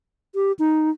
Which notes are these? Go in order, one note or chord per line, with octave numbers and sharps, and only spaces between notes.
G4
D#4